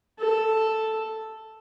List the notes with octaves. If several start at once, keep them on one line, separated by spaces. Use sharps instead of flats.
A4